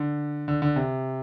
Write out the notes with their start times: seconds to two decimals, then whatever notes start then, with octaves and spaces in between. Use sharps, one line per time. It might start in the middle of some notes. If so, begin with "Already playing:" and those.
Already playing: D3
0.48 D3
0.62 D3
0.76 C3